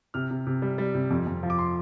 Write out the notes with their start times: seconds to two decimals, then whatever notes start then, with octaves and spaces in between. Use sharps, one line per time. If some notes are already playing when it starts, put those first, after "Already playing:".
0.14 C3 F6
0.31 C3
0.47 C3
0.62 G3
0.78 G3
0.95 C3
1.10 F2
1.27 F2
1.43 F3
1.50 D6
1.59 C6